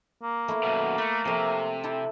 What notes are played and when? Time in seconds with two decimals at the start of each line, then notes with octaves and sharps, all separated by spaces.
0.23 A#3
0.48 A3 B3 E4
0.63 F#2 B2
0.98 A3 B5 C6
1.25 C3 F3 A3
1.83 E4 G4 A4